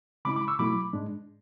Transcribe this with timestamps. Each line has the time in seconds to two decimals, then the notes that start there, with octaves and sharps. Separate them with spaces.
0.25 C#3 G#3 C#4 E4 B5 D6
0.36 B5 D6
0.48 C#6 E6
0.59 B2 F#3 A3 E4 B5 D6
0.93 G#2 G#3 D4